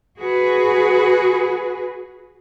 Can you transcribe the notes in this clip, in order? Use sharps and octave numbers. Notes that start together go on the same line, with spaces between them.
F#4 G#4 B4